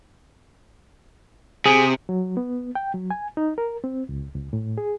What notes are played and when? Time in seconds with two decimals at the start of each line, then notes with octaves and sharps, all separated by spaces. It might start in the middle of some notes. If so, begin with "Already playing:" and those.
1.66 C3 G#4
2.09 F#3
2.37 B3
2.75 G5
2.94 F#3
3.11 G#5
3.37 D#4
3.58 A#4
3.84 C4
4.09 C#2
4.34 C#2
4.53 A2
4.78 G#4